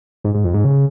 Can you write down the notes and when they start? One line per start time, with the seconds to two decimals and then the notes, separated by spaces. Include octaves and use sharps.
0.24 G#2
0.35 G#2
0.44 F2
0.54 G#2
0.64 C#3